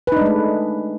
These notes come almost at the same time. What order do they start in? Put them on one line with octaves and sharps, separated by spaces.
B4 D#4 D4 G#3 A3